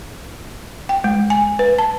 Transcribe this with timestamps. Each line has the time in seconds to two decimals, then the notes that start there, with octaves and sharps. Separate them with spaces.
0.89 G5
1.04 G#3
1.30 G#5
1.59 B4
1.79 A5